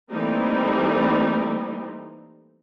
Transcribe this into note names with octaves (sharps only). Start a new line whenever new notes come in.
E3 G3 A3 A#3 C4 D#4